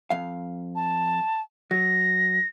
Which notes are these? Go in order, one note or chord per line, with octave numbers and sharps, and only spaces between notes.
F2 F5
A5
F#3 A#6